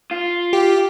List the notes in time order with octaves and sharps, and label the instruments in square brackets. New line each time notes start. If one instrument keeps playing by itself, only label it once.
[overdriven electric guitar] F4
[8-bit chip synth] G4